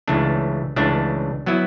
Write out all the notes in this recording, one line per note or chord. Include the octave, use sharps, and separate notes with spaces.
C#2 C#3 E3 A3 D4
C#2 C#3 E3 A3 D4
F#3 B3 E4